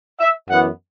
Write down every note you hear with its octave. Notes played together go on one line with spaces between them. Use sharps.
E5
F#2 E3 B3 F#5